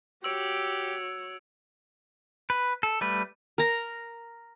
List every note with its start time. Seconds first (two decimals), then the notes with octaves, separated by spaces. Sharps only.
0.24 F#4 G4 C#5 E6 D7
2.50 B4
2.83 A4
3.01 G3 A3 B4
3.58 A#4 A#5